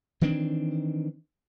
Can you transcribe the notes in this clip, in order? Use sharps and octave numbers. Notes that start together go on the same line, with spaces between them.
D#3 E3 C4 D4